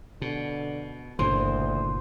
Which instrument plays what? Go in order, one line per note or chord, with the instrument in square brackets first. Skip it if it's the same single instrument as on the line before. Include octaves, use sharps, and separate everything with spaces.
[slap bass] B2 [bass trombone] D3
[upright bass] G1 [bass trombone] D2 [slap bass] A#2 C#3 E3 [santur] C5